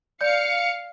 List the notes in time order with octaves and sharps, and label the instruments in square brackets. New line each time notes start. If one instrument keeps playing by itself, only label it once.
[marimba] D5 G6 [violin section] F5 C#7